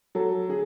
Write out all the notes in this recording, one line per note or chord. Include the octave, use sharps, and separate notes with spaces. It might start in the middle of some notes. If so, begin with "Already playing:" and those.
F#3 A4
D3 G#4